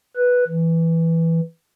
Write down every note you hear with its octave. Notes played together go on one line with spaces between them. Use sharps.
B4
E3